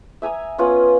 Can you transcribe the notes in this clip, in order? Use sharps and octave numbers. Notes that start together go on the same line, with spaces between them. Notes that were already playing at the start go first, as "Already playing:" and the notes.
E5 G#5 A#5 D#6
B3 C#4 F4 B4